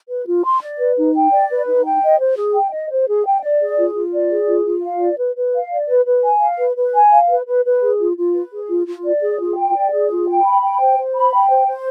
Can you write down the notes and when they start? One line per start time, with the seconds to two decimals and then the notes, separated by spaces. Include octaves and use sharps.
0.09 B4
0.27 F4
0.44 C6
0.61 D5
0.79 B4
0.98 D#4
1.14 G5
1.32 D5
1.50 B4
1.66 D#4
1.85 G5
2.02 D#5
2.19 C5
2.37 G#4
2.54 G5
2.72 D#5
2.90 C5
3.07 G#4
3.26 G5
3.42 D5
3.60 G#4
3.78 F4
3.95 F4
4.13 D5
4.31 G#4
4.47 F4
4.65 F4
4.82 F5
5.00 D5
5.18 B4
5.36 B4
5.54 F5
5.71 D5
5.88 B4
6.05 B4
6.23 G#5
6.41 F5
6.58 B4
6.76 B4
6.94 G#5
7.11 F5
7.29 B4
7.46 B4
7.64 B4
7.81 G#4
7.99 F4
8.17 F4
8.34 B4
8.52 G#4
8.69 F4
8.87 F4
9.05 D5
9.21 G#4
9.39 F4
9.57 G5
9.74 D5
9.92 G#4
10.10 F4
10.27 G5
10.44 B5
10.61 G5
10.79 C5
10.97 C5
11.15 B5
11.32 G5
11.50 C5
11.67 C5